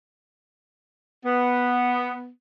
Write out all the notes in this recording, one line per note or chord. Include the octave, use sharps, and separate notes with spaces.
B3